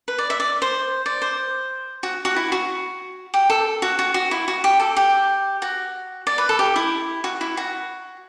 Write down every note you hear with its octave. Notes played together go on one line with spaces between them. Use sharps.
B4
D5
E5
D5
C5
D5
C5
F#4
F#4
E4
F#4
G4
A4
F#4
F#4
F#4
E4
F#4
G4
A4
G4
F#4
D5
B4
A4
G4
E4
F#4
E4
F#4